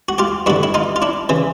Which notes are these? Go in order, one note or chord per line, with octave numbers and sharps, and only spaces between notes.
F#4
F4 G4
G2 D3 E4 F#4
E4
D#4 F4
F4
D4 E4
C#3 E3